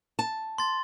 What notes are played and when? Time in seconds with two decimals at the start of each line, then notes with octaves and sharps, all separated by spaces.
0.19 A5
0.58 C6 A6